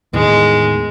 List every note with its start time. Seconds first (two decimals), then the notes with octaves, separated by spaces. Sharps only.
0.13 E2 A2 D#3 G#3